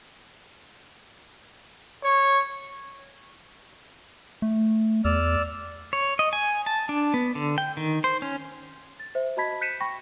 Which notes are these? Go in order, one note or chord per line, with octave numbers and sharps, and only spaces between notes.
C#5
A3
E2 D5 E6 F6
C#5
D#5
G#5
A5
D4
B3
D3
G5
D#3
C5
C#4
A6
C5 E5
F#4 D#5 A5 B5 G#6 B6
F#6 G6 B6 C#7 D#7 E7
G5 B5 C#6 A#6